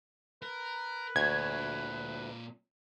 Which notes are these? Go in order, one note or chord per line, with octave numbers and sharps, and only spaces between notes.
A#4 B4
D2 A#2 C#5 G#6